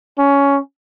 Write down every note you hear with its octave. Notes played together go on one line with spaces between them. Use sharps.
C#4